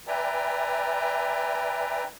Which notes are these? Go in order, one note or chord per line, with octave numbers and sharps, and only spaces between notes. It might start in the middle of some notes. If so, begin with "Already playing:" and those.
B4 D5 E5 G5 G#5 A#5